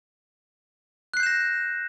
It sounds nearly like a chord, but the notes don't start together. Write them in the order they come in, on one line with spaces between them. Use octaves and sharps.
F#6 C7 G6 E7 A#6